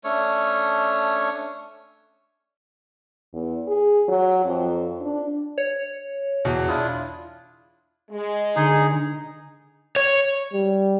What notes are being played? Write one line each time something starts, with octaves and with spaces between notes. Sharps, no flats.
A3 C#4 D4 C#5
E2
G#4
F#3
F2
D4
C#5
E2 B2 G#4
D4 E4 F4 D#6
G#3
D3 D#4 G#4
C#5
G3